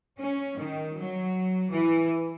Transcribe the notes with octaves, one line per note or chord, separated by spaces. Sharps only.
C#4
D#3
F#3
E3